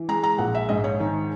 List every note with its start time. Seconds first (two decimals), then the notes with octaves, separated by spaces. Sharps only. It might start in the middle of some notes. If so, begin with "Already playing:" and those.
Already playing: E3
0.08 G#3 A#5
0.23 A#5
0.38 A#1 F#5
0.55 E5
0.69 G#2 D#5
0.84 C#5
1.00 D#3